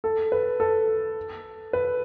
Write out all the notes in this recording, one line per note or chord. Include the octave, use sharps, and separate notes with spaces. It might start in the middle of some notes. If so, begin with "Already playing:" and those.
A4
B4
A4
B4